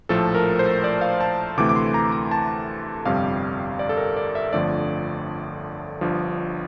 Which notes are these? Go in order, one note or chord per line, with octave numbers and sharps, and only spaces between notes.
A#1 A2 F3 A3 A4
A#4
C5
D5
F5
A5
D2 C3 E3 A3 D6
D6
C6
A#5
A#5
A5
G1 F2 C3 G3 F5
D5
A4
A#4
D5
E5
G1 F2 D3 F3 A3 D5
G1 G2 F3